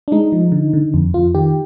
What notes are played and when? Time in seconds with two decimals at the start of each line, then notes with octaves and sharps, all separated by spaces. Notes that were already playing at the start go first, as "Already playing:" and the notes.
0.08 D4
0.12 G#3 D#4
0.32 F3
0.52 D3
0.73 D3
0.94 F2
1.14 F2 F4
1.35 D#3 G4